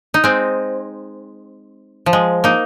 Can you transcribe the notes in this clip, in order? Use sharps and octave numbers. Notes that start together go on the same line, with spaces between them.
D#4
G#3 C4
F3
G#3
A#3 D#4